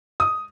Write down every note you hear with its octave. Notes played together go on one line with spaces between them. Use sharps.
D#6